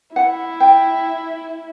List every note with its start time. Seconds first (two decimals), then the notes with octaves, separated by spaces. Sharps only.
0.16 E4 F#5
0.60 G5